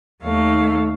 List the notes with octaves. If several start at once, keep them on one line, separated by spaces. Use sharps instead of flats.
D#2 D#3 A3 C#5 F5